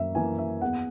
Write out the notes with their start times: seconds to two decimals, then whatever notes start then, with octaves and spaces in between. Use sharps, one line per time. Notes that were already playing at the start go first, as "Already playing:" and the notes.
Already playing: F#2 A#3 E5
0.15 E3 A#3 G#5
0.38 E5
0.62 E2 F#5